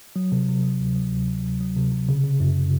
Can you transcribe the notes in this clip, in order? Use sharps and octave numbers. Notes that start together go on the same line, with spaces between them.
F#3
C3
C3
F#3
D2
F#3
D2
C3
C3
F#3
C3
C3
C#3
C#3
F#2